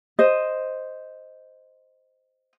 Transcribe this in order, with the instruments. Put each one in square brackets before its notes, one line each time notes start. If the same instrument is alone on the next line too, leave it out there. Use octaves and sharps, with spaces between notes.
[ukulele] C5 D#5